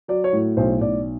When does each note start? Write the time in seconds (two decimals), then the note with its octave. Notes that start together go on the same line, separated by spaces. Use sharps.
0.08 F#3 D5
0.24 C#5
0.33 A2
0.57 B1 C5
0.81 B1 D5